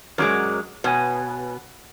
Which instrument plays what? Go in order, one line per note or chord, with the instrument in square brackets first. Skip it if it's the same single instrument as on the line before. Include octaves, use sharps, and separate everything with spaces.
[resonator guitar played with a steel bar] F#2 F#3 G#3 [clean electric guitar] A#4 C#5 D5
[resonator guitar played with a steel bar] B2 [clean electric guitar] B4 C#5 G#5